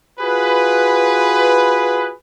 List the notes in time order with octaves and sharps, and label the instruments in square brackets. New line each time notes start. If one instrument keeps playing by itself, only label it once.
[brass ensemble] F4 F#4 G#4 B4